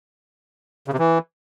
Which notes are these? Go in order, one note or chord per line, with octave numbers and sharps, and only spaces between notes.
C#3
C3
E3